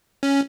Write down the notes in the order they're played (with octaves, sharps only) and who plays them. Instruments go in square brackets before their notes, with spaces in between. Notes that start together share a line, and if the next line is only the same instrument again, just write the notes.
[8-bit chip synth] C#4